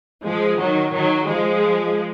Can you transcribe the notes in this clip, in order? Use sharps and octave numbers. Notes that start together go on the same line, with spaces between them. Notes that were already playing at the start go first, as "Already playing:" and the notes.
F3 G#3
D#3 F#3
D#3 F#3
F3 G#3